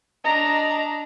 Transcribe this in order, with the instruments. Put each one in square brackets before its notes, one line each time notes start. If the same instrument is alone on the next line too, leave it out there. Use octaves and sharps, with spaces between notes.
[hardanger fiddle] D4 [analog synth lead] D#5 [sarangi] A#5